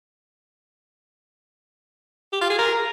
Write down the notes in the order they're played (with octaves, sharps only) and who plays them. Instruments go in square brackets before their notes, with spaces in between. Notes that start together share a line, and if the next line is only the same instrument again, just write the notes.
[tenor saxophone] G4
F4
G#4
A#4